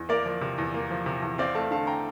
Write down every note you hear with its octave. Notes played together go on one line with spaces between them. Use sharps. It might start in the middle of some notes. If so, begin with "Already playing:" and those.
Already playing: E2
A#3 A#4 D5
F3
C3
E2
A#3
F3
C3
E2
C4 D5 F5
A3 F5 A5
D3 F5 A5
G5 A#5